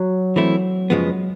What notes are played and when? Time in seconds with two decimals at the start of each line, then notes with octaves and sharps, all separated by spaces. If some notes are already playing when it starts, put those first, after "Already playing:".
Already playing: F#3
0.36 E3 A3 C4 E4
0.90 F#2 C#3 F3 G#3 B3